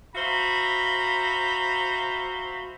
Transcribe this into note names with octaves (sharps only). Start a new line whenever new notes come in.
F#4 C5 E5 F5 A#5 B5